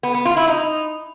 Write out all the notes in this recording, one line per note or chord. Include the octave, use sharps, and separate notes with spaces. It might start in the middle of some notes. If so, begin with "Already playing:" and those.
B3
B3
F4
E4
D#4